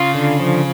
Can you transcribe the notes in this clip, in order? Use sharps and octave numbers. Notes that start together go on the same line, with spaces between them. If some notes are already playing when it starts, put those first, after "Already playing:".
Already playing: C#3 F4
D3
F3